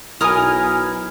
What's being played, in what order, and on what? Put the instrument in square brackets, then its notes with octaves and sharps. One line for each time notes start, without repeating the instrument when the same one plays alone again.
[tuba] B1 [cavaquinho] D#4 A#4 D#6 [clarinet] E4 [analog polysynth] G#5 F6